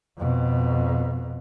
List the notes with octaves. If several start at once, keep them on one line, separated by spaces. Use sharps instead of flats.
F2 B2